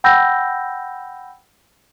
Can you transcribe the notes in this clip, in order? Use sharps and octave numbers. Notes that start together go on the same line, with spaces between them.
F#5 G5 B5 E6 G6 A#6